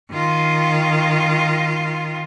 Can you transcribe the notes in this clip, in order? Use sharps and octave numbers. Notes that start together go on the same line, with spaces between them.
D#3 F4